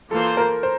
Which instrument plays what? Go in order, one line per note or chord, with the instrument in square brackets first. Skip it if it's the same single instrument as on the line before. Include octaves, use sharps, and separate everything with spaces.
[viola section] E3 A#3 F4 C5 [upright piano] A4
[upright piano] A#4
C5